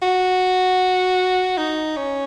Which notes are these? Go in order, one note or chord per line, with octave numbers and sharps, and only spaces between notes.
F#4
D#4
C#4